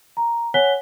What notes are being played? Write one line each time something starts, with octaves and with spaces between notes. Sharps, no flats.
A#5
C#5 F#5 G#5 F#6 B6 G7